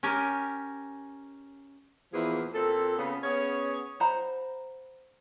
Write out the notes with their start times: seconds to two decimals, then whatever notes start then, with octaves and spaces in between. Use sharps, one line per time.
0.03 C#4 G4 A#4 G#5
2.13 E2 A#2 E3 F3 G#4
2.53 A#2 C4 A4
2.97 C#3 B3
3.23 B3 C#4 G#4 C#5
4.00 C5 F#5 A#5 B5